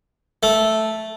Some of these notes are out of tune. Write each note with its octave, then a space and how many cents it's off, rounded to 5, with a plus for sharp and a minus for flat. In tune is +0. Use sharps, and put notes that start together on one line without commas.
A3 -5